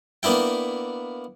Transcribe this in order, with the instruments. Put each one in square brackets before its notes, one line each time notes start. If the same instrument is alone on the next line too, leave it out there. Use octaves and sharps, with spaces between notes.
[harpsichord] A#3 B3 D4 E4 G5